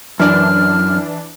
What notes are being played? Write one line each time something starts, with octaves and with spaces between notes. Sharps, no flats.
F#2 E3 D4 F6